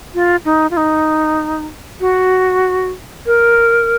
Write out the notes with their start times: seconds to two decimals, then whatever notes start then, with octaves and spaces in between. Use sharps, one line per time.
0.15 F4
0.45 D#4
0.71 F4
0.77 D#4
2.00 F#4
3.26 A#4